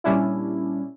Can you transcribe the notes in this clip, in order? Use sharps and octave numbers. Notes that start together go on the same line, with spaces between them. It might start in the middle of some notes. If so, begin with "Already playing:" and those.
A#2 G3 C#4 D4 E4